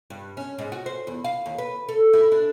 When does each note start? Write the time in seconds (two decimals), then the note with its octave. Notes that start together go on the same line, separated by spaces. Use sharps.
0.10 G2
0.37 C#4
0.58 G#2
0.72 F#4
0.86 C5
1.07 E2
1.24 F5
1.46 D#2
1.58 B4
1.89 A4
2.13 E4
2.32 D4